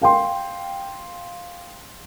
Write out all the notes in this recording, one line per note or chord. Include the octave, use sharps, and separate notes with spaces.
F5 G5 C6